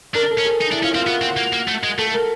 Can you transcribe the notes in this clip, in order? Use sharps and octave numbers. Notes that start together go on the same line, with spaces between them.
D4 A#4
A4
C#4
G#4
D#4
D4 E4
C#4 F4
C4 F4
B3 F#4
C4
A#3
A#3
A3
G#3
A3 A4
A#4